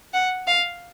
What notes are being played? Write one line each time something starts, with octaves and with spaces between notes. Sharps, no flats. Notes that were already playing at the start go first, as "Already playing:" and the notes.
F#5
F5